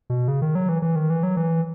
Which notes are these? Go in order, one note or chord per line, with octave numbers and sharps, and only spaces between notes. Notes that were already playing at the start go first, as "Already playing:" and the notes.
B2
C#3
D#3
F#3
E3
E3
D#3
E3
F#3
E3